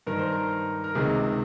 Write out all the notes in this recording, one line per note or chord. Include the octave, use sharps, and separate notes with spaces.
G2 D#3 A#4
C5
A#4
A#4
C#2 C3 D#3 G#4